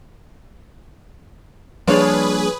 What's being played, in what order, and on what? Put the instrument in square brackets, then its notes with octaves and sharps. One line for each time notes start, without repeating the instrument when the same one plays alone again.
[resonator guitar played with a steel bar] F3 C#5 D5 [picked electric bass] G3 A#3 D4 [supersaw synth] G#4 B4